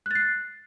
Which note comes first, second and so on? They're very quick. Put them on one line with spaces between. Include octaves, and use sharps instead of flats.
F#6 A6 C7